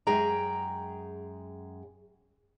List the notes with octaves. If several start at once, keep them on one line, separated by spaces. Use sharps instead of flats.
F#2 G#3 G#4 G5 A#5